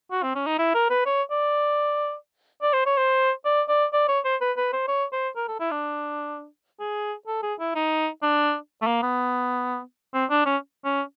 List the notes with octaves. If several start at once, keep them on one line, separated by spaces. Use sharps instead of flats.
F#4
C4
C#4
D#4
E4
A#4
B4
C#5
D5
D5
C5
C#5
C5
D5
D5
D5
C#5
C5
B4
B4
C5
C#5
C5
A#4
A4
E4
D4
G#4
A4
G#4
E4
D#4
D4
A3
A#3
B3
C4
D4
C#4
C#4